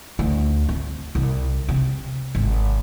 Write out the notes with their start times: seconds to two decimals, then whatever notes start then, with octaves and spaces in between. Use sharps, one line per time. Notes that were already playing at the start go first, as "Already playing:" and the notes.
0.19 D2
0.69 C4
1.15 C2
1.69 C3
2.35 G#1